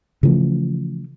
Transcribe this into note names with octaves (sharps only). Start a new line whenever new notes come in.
C#3 E3 F3 A3